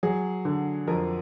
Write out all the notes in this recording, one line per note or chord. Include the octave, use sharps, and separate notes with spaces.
F#3 G#4
D3
F2 A#4